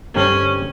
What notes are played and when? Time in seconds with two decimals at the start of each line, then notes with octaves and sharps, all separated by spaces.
0.15 G2 D3 G3 C4 C#4